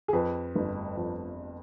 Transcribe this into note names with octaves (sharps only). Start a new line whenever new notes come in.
G#4
F2 B4
G1
F2